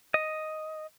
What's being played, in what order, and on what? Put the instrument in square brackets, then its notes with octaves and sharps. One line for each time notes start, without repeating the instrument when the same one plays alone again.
[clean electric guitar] D#5